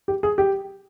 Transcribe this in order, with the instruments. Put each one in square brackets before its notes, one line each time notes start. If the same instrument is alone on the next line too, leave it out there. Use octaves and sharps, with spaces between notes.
[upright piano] G4
G#4
G4